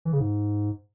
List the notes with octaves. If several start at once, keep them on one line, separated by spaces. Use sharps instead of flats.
E3
C#3
G#2